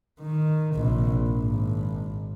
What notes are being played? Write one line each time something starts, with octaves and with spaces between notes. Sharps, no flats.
D#3
A#1 C3
G#1